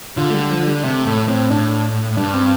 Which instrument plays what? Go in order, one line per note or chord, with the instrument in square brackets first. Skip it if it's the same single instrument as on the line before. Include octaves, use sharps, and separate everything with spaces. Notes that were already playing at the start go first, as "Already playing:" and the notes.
[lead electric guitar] D3 [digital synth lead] F4
[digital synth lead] A3
G3
F3
G3
[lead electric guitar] C3 [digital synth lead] A3
[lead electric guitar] A2 [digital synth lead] A3
[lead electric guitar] A2 [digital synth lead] C4
[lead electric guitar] A2 [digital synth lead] D4
[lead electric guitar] G2 [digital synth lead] D4
[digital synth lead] C4